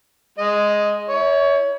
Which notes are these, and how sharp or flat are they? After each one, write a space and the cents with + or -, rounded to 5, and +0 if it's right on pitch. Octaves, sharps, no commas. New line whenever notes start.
G#3 +0 D#5 +0
E4 -35 C#5 +20